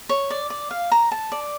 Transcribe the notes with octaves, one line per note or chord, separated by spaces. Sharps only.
C#5
D5
D5
F5
A#5
A5
D5